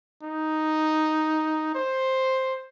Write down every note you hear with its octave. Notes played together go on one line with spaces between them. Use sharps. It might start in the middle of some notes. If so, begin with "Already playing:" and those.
D#4
C5